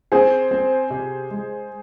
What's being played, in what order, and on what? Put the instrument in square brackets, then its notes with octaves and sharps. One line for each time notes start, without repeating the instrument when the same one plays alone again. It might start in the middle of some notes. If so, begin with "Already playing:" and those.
[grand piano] C4 [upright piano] G#4 C5
[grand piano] C4
C3
G#3